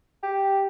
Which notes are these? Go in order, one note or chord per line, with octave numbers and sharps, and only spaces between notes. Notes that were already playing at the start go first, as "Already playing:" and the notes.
G4